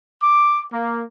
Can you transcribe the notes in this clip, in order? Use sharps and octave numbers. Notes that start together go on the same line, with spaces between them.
D6
A#3